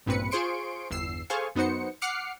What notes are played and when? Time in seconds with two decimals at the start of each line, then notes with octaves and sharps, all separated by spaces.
0.06 A1 G2 A#2 C4 B4 C#7
0.31 F4 G#4 C5 C6 C#6 D7
0.91 G1 E2 E6 C7
1.30 G#4 A4 C5 F5 G#5 C#6
1.55 F#2 B3 D#4 F#4 C5 C#7
2.02 F#5 D6 F6 C7 C#7